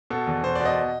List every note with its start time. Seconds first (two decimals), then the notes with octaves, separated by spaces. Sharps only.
0.10 B2 A4
0.27 E2
0.44 B2 C5
0.55 B2 D5
0.65 D#5